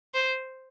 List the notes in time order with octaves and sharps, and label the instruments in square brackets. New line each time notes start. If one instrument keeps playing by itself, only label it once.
[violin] C5